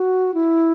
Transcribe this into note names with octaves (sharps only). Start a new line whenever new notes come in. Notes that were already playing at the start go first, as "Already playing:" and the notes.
Already playing: F#4
E4